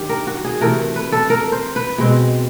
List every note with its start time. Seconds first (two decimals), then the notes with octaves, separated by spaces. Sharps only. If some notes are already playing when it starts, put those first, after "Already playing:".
Already playing: G2 D#3 G4
0.09 A#4
0.27 F#4
0.45 G#4
0.61 C3 E3 A3 A#4
0.96 B4
1.12 A4
1.30 A#4
1.52 C5
1.76 B4
1.98 B2 G#3 C4